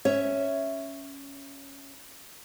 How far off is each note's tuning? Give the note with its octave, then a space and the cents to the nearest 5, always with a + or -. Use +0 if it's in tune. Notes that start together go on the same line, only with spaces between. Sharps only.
C#4 +0 C#5 +0 E5 +0